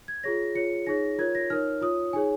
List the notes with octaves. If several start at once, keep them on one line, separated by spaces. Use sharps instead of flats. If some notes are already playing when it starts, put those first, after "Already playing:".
G#6
F4 G#4 C#5 A#6
F4 G#4 C#5 C#7
D#4 G#4 C#5 A#6
F4 A#4 C#5 G#6
A#6
D#4 A#4 C#5 F6
F4 C#5 D#6
D#4 G#4 C#5 G#5